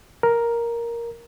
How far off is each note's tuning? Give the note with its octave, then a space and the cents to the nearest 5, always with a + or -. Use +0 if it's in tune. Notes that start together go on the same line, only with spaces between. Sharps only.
A#4 +5